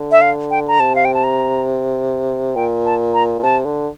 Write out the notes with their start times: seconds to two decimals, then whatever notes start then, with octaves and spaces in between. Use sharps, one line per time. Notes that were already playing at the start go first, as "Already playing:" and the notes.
Already playing: D3
0.12 E5
0.21 F5
0.51 G5
0.68 A#5
0.80 C3 A5
0.95 F5
1.05 G5
1.14 A5
1.24 A#5
2.55 A#2 G5
2.85 A5
3.14 A#5
3.39 A#2
3.43 C3 A5
3.65 D3